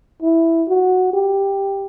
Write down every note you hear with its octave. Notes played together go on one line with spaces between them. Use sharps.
E4
F#4
G4